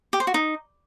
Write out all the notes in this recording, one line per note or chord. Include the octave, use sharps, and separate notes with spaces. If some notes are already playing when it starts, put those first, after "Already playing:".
G4
C5
F#4
D#4